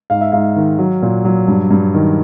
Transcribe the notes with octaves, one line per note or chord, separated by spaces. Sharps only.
G#2 F5
E5
G#2 F5
D#3
F#3
A#2
F#3
G2
G2
D#3